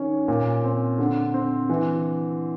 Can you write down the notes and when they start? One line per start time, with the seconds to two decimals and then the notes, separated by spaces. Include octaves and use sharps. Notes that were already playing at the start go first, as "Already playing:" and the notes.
Already playing: D#3 C#4
0.28 A#2
0.64 C4
0.99 D3
1.34 C4
1.69 E3